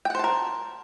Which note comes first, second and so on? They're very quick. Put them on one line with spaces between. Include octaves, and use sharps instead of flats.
G5 F#5 C5 A5 A#4